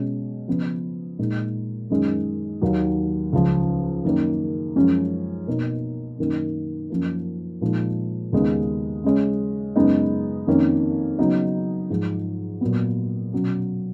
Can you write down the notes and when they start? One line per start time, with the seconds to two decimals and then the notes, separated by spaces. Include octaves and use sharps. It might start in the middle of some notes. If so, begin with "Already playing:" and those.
Already playing: B2 G#3 C#4
0.48 C#3 F3 B3
1.19 A#2 G#3 D#4
1.90 F#2 D#3 G#3 C#4
2.62 D#2 D#3 F#3
3.33 C#2 C#3 F3
4.05 F#2 D#3 A#3
4.76 F#2 F3 G#3 C#4
5.47 B2 A#3 D#4
6.19 F#2 D#3 A#3
6.90 F#2 F3 A#3
7.61 A#2 F3 G#3 D#4
8.33 D#2 C#3 G#3 B3 D#4
9.04 C#3 G#3 C#4
9.76 F#2 C#3 G#3 B3 D#4
10.47 F2 D#3 A#3 C#4
11.19 C#3 F#3 B3 D#4
11.90 G#2 F3 G#3
12.61 A#2 F#3 B3
13.33 B2 F#3 C#4